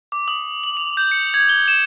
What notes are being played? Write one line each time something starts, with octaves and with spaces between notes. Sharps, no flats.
D6
D#6
F#7
F7
G6
C#7
G#6
G7
E7